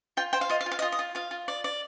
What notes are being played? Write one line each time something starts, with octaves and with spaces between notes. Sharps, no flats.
F4 G5
C5 G5
F5
F4 D#5
F5
F4
F5
D#5
F4
D#5
F4
F4 F5
F4
D5
D5